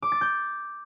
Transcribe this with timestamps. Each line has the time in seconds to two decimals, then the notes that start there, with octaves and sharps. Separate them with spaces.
0.02 D6
0.12 A6
0.21 G6